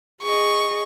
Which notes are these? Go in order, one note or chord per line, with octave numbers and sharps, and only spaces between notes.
G#4 D#5 C#6